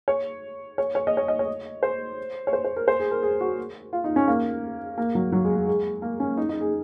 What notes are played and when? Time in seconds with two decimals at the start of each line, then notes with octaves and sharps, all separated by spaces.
0.08 C#5
0.78 C#5
0.95 C#5
1.07 D#5
1.17 C#5
1.28 D#5
1.39 C#5
1.83 C5
2.47 C#5
2.53 C5
2.64 C5
2.76 A#4
2.88 C5
2.99 G#4
3.11 A#4
3.23 G#4
3.41 F#4
3.93 F4
4.04 D#4
4.16 C#4
4.28 A#3
4.98 A#3
5.15 F#3
5.32 F#3
5.44 G#3
5.56 G#3
5.67 G#3
6.02 A#3
6.20 C#4
6.37 D#4
6.49 D#4
6.61 G#4